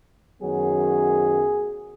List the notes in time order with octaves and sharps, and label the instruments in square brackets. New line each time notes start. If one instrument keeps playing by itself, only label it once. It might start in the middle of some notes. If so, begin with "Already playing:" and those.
[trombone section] F#2 D#3 F#3 B3 G#4